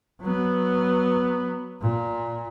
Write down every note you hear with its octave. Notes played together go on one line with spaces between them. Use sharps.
F#3 B3
A#2